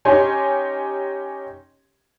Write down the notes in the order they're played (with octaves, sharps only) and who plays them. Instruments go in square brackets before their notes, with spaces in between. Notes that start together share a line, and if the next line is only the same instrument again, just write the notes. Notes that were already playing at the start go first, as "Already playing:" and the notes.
[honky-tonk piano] C#4 D#4 G4 C#5 G#5 C6